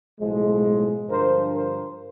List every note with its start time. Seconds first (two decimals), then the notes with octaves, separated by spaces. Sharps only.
0.20 B1 A2 F3 G#3
1.08 G2 D3 F3 A#4 C5
1.53 A#4 C5